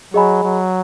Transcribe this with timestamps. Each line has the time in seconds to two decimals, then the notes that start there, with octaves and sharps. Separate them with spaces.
0.14 F#3 G#4 D#5 G#5 B5
0.44 F#3